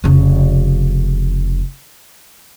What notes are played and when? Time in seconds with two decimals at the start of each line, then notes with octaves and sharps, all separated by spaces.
0.04 F1 C#3